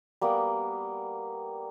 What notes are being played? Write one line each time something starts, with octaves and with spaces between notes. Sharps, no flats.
G3 A#3 B3